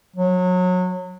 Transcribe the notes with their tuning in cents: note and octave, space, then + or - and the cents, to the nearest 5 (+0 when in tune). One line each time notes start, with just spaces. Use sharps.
F#3 -25